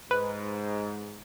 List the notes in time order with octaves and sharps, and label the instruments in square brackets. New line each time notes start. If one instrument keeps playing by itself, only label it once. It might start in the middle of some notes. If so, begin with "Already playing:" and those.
[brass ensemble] G#2 [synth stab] B4